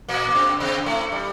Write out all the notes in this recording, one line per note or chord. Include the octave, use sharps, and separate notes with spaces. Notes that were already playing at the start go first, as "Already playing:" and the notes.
A#2 A#3
A#3
C3 C4
C3 C4
A2 A3
G3